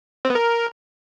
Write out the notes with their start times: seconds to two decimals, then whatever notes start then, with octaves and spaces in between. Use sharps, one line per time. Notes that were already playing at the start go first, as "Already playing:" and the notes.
0.25 C4
0.30 B3
0.35 A#4